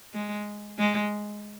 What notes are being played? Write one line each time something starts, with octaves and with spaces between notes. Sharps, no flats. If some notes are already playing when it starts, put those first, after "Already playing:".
G#3
G#3